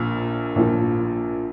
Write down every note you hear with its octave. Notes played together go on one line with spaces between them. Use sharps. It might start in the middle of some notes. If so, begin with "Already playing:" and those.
Already playing: A#1 A#2 F3
A#1 A#2 F3